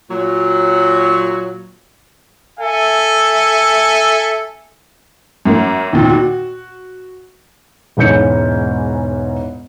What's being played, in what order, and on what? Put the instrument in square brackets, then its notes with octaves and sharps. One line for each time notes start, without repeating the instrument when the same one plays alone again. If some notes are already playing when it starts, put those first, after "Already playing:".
[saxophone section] A#2 F#3
[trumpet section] A4 E5 G#5
[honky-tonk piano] F#2 A#3
D#2 A#2
F#4
[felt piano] E1 G#2 E3 C#4 G6 C#7